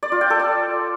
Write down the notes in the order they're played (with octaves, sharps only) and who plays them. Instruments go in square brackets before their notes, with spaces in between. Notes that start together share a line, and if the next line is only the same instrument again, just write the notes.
[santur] D5
F4
G5
A4
D5